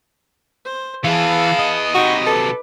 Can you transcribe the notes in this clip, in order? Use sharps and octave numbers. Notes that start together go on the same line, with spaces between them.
C5
E3 B3 E4 G#4 F5 A5
D#5
C3 F#3 D#4 F#4 B5
A4 B4 D6